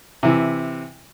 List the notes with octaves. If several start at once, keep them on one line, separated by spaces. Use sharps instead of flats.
C3 E3